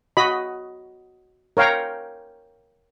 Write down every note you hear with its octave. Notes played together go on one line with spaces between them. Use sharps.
F#4 D#5 B5
A#4 C#5 F5 G5 A#5